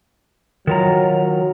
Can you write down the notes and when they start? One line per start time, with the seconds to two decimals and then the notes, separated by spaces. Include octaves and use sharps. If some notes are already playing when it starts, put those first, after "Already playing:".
0.67 D#3 F#3 F4 A#5